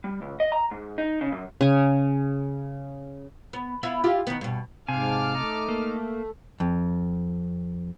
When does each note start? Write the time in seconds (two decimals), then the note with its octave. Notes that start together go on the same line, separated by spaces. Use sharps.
0.04 G3
0.22 C#2
0.40 D#5
0.52 A#5
0.71 G#2
0.98 D#4
1.21 C#3
1.32 F#2
1.61 C#3 G#5
3.53 B3
3.83 B3 E4 F4
4.04 E4 F4 G4
4.27 D#3 B3
4.41 G2 B2
4.88 G#2 C3 F5 G#5 A5 D6 F6
5.35 A3 D#4
5.69 A#3
6.60 F2